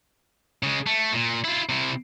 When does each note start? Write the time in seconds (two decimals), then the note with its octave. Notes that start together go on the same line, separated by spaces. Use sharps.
0.63 C#3 G#3
0.87 A3
1.13 A#2
1.45 E4 F4
1.69 C3 E4